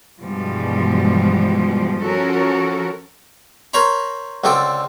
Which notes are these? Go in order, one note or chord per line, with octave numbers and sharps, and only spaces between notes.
G2 B2 E3 F3 G3 G#3
F3 C#4 F#4 A4 A#4
A#4 C5 C#5 A#5 B5
C#2 D3 C4 A4 D5